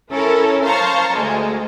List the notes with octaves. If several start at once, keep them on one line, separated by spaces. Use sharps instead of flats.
C#4 E4 A4 A#4
C5 F5 A5 A#5 C#6
D2 G#3